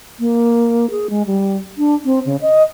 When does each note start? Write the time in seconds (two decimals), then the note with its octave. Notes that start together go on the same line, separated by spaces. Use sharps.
0.19 A#3
0.90 G#4
1.10 G#3
1.26 G3
1.78 D4
2.05 C4
2.25 C#3
2.42 D#5